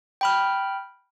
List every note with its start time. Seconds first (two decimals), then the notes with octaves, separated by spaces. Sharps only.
0.21 G5 B5 F6